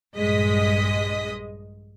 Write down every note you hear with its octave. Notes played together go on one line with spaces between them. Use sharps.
A#1 G2 G#3 D#5 D#6 B6